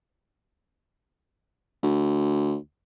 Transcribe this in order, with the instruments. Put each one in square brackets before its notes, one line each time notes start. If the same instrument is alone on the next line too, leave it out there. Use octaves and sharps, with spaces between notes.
[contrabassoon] D2